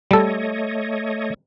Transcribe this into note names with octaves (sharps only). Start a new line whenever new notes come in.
G3 A3 A4 C#5 D#5